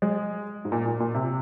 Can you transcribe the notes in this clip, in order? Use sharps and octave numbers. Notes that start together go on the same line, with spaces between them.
G#3
G#2
A#2
A#2
A#2
C3